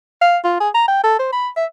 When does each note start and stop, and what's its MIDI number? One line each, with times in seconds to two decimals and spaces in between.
0.22 0.38 77
0.45 0.58 65
0.61 0.69 68
0.75 0.88 82
0.88 1.03 79
1.04 1.19 69
1.19 1.30 72
1.33 1.49 83
1.57 1.66 76